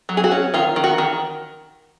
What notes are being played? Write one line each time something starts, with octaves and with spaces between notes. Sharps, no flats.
F#3
G#4
F#4
C#4
D#3 F4
D#3
F#4
D#3